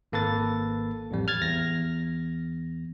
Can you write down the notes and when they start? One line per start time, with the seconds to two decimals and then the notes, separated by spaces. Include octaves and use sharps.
0.12 G#1 A#3 A4 B4 A6
1.11 A1 F2 G3
1.28 F6 G#6 A6
1.41 E2 A#6